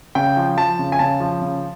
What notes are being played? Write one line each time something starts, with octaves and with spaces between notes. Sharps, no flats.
C#3 G5
F3
F3 A5
C#3
G#5
C#3 A5
F3
C#3